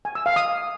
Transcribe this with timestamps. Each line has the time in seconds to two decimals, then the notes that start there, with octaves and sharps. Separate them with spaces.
0.05 G#5
0.15 E6
0.26 F5
0.36 D#6